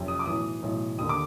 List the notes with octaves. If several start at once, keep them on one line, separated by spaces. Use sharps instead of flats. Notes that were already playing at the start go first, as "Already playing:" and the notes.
Already playing: F#1 F2 C3
D#6
D6
B1 A2 E3 D#6
B1 A2 E3
D#2 D3 D#6
D6